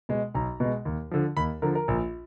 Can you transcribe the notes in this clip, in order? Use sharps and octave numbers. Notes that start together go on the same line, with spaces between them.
B2 G#3
B1 A#5
B2 G#3
D#2
D3 F3
D#2 B5
D3 F3 A#4
A#4
A#1